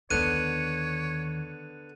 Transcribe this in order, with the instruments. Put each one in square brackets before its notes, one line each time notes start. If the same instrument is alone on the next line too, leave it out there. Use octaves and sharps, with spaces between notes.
[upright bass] D#2 D#3 [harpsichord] D3 B3 [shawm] C#5 [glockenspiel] F#6 D#7